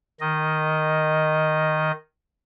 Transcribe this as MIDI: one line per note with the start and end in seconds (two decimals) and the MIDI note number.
0.20 1.91 51
0.20 1.91 75